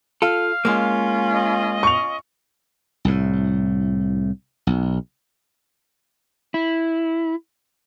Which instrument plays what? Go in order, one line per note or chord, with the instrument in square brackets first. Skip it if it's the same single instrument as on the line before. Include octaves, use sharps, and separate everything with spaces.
[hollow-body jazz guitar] F4 A4 [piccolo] F5
[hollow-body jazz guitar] G#3 A#3 [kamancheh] C#4 F4
[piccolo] D#5
[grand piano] C#6 F7
[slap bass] C2 A2
B1
[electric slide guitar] E4